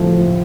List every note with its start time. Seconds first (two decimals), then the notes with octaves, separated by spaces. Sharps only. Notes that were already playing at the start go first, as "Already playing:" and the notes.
Already playing: A2 F3